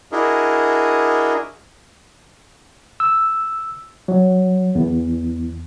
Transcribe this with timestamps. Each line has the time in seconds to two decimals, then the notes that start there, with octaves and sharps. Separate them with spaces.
0.12 D4 E4 F#4 G#4 A#4 D#5
3.00 E6
4.08 F#3
4.75 E2